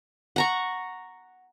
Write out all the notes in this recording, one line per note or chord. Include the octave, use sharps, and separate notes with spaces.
F#5 A#5 C#6